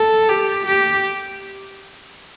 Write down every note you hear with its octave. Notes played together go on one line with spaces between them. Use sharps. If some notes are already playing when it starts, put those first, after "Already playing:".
Already playing: A4
G4
G4